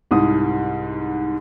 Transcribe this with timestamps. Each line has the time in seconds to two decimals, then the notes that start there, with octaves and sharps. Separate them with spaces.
0.11 C2 G#2 D#6